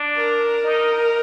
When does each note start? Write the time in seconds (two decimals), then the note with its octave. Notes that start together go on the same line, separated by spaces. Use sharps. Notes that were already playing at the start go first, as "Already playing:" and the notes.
Already playing: D4
0.18 A#4
0.63 D#4